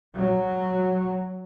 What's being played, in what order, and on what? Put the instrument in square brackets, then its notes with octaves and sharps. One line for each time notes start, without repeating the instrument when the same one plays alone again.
[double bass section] F#3